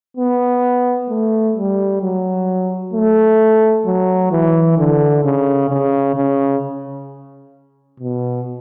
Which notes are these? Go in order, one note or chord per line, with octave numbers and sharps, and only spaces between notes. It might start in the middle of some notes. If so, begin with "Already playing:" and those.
B3
A3
G3
F#3
A3
F#3
E3
D3
C#3
C#3
C#3
B2